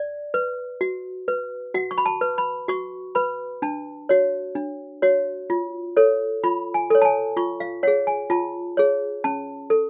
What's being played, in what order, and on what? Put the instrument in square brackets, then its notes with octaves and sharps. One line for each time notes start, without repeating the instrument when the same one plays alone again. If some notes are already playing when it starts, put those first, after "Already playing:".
Already playing: [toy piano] D5
B4
F#4
B4
F#4 F#5
C#6
B5
A5
B4
B5
F#4 C#6
B4 B5
D4 A5
F#4 C#5
D4
F#4 C#5
F4
A4 C#5
F4 B5
G#5
A4 C#5
A5
G#5
F4 C#6
F5
G#4 C#5 F#5
G#5
F4 A5
G#4 C#5
C#4 A5
A4